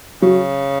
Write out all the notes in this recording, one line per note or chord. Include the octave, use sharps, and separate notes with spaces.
C#3 F#3